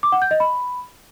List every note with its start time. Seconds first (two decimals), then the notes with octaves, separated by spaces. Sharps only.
0.03 D6
0.12 F#5
0.22 G6
0.31 D#5
0.40 B5